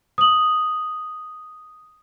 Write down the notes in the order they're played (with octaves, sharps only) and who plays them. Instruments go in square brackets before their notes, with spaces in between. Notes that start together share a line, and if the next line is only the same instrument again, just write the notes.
[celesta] D#6 F#7